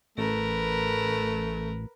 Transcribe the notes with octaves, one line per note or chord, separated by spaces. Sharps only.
A1 A3 A#4 B4